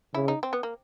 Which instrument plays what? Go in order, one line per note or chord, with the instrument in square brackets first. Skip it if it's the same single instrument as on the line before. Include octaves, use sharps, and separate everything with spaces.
[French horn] C#3 [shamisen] E4
[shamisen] D#4
C4
B3
A#3